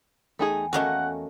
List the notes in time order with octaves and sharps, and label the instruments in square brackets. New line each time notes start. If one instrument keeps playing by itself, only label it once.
[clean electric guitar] E2 G5 G#5 [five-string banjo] A3 D#4 G#4
[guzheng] A3 A#3 C#4 [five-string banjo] F#4 D#5 [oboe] F#5